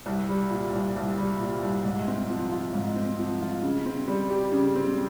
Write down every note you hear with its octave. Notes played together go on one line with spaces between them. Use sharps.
C2
G3
A#2
C2
C2
G3
A#2
C2
G#2
C4
F3
F4
G#2
C4
F3
F4
C#3
C4
G3
G4
C#3
C4